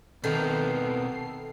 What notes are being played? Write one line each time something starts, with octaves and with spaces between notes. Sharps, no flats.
B2 D#3 B3 C4 A4 A#4 C7